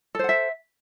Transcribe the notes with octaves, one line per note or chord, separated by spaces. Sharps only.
A4 C5 E5 F#5